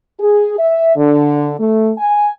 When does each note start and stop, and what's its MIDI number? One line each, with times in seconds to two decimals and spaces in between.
0.19 0.55 68
0.59 0.94 76
0.96 1.53 50
1.60 1.91 57
1.97 2.27 80